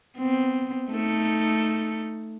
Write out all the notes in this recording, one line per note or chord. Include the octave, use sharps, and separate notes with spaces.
B3 C4
A3 D#4 A4